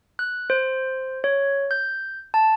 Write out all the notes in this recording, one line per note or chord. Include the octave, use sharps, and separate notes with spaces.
F#6
C5
C#5
G6
A5